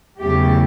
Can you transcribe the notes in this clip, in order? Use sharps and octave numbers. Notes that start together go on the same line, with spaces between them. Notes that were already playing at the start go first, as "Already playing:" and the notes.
E2 C#3 F#3 A3 G4